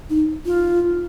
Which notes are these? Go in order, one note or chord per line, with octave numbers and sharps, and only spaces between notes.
D#4
F4